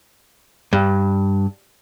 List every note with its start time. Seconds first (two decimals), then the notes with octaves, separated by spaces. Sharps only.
0.73 G2